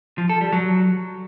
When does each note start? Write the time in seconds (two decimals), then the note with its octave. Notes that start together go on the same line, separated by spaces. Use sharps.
0.18 F3
0.29 A4
0.41 G3
0.52 F#3